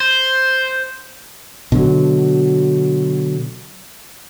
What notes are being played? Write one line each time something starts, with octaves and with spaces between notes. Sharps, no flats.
C5
B2 D3 F#3